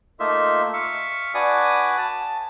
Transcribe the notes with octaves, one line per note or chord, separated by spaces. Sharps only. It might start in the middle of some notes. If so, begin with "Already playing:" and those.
A3 A#3 D#4 F4 E5
E5 F5 C#6
D4 F#4 B4 D5 G#5 D#6
A5